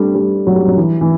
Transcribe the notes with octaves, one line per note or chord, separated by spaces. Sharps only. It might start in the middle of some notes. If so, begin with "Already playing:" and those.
Already playing: G3 A3 D4
G3
F#3
G3
F#3
E3
E3